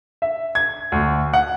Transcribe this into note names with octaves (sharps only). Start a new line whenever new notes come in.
E5
G#6
D2
F#5